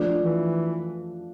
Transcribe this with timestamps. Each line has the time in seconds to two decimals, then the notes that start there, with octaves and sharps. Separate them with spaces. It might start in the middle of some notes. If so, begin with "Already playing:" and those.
Already playing: F3 A3 D4
0.21 E3